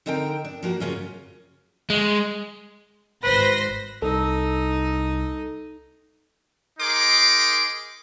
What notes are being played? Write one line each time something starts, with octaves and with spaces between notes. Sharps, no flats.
D3 C4 D#4 A#4 G5
D4
F3 A#3 F#4
F#2 C#3 C#4 F4
G#3
G#1 B4 C5 A#6
C2 D#4 A4
D#4 G#4 A#4 C6 D6